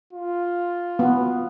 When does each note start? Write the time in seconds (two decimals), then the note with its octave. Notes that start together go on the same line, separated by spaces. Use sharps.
0.13 F4
0.99 B3